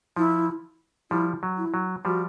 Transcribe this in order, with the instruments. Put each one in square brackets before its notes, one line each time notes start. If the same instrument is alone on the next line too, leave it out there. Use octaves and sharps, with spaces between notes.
[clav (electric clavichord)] F3 [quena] E4
[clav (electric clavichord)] F3 G3 [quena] E4
[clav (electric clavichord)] F#3
[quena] E4
[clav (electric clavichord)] F#3
[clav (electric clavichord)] F3 G3 [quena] F#4